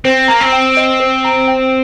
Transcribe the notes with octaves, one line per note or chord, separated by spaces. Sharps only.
C4 C5
A#3 A#5
C4
G5
D#5
C5
A#5
G5